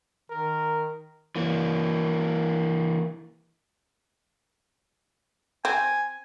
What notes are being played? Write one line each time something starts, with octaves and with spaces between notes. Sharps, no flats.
D#3 A#4
E3 A#3
C4 G#5